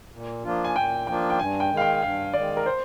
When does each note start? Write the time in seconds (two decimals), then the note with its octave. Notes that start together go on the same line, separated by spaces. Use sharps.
0.12 A#2
0.44 F3 A#3 D4 F4
0.64 G#5
0.76 A#2 G5
1.07 F3 A#3 D4 F4 G5
1.30 G5
1.38 G2 G#5
1.60 G5
1.70 D#3 G#3
1.77 F5
1.81 G5
2.02 G2 F5
2.33 D#3 G#3 D5
2.57 A#4
2.66 C5